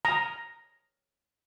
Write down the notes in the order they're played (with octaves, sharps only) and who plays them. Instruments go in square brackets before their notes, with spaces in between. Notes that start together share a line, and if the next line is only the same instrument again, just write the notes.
[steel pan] A#5